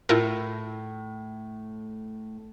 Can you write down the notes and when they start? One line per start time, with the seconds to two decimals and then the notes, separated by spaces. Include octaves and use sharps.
0.09 A2 E4 F4 A#4